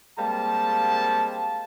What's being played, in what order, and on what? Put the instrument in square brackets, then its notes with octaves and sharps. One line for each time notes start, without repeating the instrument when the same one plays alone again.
[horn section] G3 G#3 A#3 C4 A5